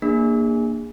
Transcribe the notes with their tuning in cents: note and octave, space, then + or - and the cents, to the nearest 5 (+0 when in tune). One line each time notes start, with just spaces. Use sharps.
A#3 +0 D4 +20 G#4 -25